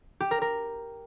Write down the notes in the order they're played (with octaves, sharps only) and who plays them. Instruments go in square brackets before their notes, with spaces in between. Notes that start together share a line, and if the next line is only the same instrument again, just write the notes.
[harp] G4
A#4
A#4